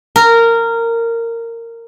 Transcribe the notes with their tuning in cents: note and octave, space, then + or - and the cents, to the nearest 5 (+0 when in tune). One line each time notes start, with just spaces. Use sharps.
A#4 -15